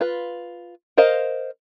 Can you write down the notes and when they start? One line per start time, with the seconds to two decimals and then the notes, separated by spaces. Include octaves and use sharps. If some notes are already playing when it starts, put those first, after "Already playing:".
0.01 F4 B4
0.97 A#4 C5 D#5 F5